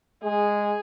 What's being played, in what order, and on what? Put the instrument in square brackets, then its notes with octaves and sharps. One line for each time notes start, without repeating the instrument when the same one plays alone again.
[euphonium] G#3 [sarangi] G#4